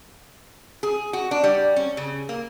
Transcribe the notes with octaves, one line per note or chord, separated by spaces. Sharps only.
G#4
F#4
D4
G3
C#4
C#3
A#3